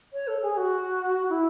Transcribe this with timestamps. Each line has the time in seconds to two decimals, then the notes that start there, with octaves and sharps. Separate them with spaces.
0.13 C#5
0.27 A4
0.42 G#4
0.57 F#4
1.29 E4